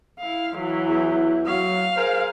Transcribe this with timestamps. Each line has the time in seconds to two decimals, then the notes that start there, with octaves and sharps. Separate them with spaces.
0.19 E4 F5
0.56 E3 F#3
0.87 E2 E4
1.47 F#3 F5
1.96 G#4 A#4 C5